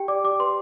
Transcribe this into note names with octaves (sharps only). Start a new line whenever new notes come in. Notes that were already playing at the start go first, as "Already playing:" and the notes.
Already playing: G4 G5
D5 D6
G4 D6
B4 C6